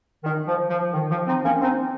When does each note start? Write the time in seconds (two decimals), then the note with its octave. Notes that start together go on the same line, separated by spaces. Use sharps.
0.24 D#3
0.47 F3
0.70 F3
0.94 D#3
1.10 F3
1.27 C4 D#4
1.44 A#3 C#4
1.62 C4 D#4